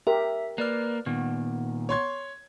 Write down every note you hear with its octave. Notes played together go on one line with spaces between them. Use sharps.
G4 A#4 E5
A#3 B4 D5 F6
A#2 D#3 B3
C#5 C6 G#6